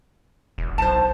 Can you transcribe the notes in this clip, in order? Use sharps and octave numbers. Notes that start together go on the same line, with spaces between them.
E1
B1 C5 A5